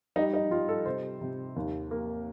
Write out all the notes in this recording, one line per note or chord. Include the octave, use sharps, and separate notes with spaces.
G3 D#4
D#4
G3 F4
A4
C3 C5
C3
D#2
A#3